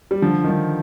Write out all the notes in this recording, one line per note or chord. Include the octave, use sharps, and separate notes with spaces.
G3
D3 F3
D#3
D3 F3